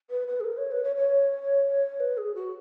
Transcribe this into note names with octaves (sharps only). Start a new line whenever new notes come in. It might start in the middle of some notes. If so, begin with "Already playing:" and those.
B4
B4
G#4
A#4
C#5
B4
C#5
C#5
B4
G#4
F#4